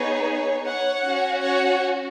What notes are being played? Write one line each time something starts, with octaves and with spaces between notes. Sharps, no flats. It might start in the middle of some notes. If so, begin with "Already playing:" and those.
Already playing: B3 D#4 G#4 C#5
C#5 F#5
C#4 F#4
C#5 F#5